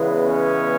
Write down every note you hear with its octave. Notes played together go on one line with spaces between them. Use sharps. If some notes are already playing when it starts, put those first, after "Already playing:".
Already playing: E2 C#3 E3 G#3 B3
C#4